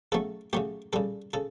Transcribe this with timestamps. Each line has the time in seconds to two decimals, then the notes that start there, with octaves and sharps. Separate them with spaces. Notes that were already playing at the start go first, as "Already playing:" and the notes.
0.12 C#3 F#3 A3 A4
0.53 C#3 F#3 A3 G4
0.93 C#3 G3 A4
1.33 C#3 A4